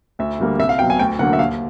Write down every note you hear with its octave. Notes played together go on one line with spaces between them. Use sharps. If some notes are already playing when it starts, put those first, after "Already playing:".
D2 E5
D3 G3 A#3
C2 E5
F5
B2 F#3 G5
G#5
D2 G5
D3 F#3 A#3 F#5
E5
D#2 F5